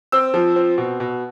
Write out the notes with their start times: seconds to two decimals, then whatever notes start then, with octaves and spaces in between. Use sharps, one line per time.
0.12 C4 E6
0.34 F3
0.56 C4
0.78 B2
1.00 B2